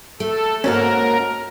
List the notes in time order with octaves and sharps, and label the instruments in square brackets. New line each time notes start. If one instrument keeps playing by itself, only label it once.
[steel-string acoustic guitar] A3 [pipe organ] A4
[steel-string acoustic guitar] G#2 F#4 A5 [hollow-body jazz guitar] A#3 C#4 [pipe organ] A#4